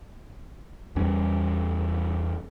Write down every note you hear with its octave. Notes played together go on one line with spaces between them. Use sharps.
E2 G3 C#4